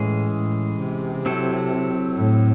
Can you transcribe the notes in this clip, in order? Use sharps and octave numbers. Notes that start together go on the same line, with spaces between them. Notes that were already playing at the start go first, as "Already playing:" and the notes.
Already playing: A2 E3 G#3 C#4 G#4
A2
C3
F#3 C4 E4 A4
A2